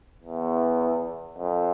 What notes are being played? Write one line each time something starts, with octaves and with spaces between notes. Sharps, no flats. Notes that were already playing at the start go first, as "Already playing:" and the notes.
E2
F2